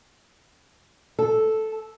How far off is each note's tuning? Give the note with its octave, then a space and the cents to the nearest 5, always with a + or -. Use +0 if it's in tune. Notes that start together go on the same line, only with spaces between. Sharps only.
A4 -5